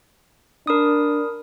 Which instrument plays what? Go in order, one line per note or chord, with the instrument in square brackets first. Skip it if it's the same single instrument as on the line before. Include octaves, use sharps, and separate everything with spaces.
[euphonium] D4 [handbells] A#4 B5 D#6